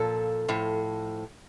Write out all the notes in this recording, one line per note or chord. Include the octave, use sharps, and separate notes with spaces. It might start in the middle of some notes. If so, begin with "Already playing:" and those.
Already playing: A#2 F3 A4
A2 F3